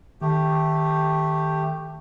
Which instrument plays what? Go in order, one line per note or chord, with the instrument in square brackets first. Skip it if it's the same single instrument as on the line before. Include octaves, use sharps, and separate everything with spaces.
[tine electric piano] D#3 [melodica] A3 G4